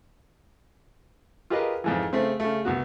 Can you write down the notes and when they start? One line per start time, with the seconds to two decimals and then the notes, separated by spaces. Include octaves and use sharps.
1.50 F4 G4 G#4 A#4 B4 D#5
1.84 F2 G#2 E3
2.13 C#3 A3 C4
2.40 C#3 A3
2.65 C2 B3 F#4